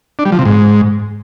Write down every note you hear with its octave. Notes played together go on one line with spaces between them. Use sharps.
D4
G3
F3
C3
G#2